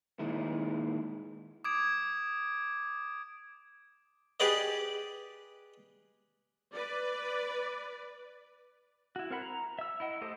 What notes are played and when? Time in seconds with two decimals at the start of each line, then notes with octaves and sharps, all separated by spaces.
0.19 A#2 D#3 G#3 E4
1.64 D6 D#6 G#6 D7
4.40 G4 G#4 B4 D5 D#5
6.73 B4 D5
9.16 E4 F#4
9.30 C4 A#4 F#5 B5
9.42 A#5
9.79 E5 E6
10.00 E4 D#5 F#5
10.21 A3 G4 A4 C5 D#5